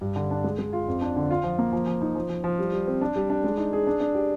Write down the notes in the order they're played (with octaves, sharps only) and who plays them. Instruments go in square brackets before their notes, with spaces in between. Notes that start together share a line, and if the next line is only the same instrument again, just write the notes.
[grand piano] G2
D3
D4
G#3
G#3
F4
F2
D4
D3
F4
F3
A#3
F3
F3
D#4
F3
F3
F3
G3
G3
C4
D4
G3
D4
G#3
D#4
G#4
D4
D4
G4